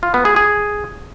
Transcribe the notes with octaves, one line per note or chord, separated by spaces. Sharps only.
F4
B3
G#4
G#4